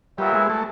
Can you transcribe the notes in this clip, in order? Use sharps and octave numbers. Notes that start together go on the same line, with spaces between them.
A#2 F#3 G3 B3 E4
G#3
A3